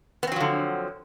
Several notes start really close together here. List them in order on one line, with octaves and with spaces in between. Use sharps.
B3 C4 F#3 F3 D3